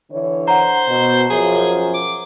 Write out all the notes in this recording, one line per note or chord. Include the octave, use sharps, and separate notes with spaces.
D3 E3 C#5
C5 F#5 A#5
B2
F#2 F3 G#4
D6